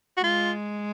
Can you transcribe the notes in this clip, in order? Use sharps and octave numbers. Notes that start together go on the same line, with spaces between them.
F#4
G#3 F4